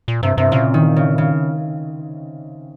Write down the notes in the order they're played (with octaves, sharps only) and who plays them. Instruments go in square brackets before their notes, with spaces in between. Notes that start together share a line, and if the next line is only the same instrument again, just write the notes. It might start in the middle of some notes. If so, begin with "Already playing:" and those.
[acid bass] A#2
[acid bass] G2 [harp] C3
[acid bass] G2 [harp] C3
[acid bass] A#2 [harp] C#3
[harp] D#3
C#3
C#3